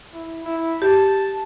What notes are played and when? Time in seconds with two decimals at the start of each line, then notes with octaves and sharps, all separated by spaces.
0.13 E4
0.44 E4
0.82 G4 A5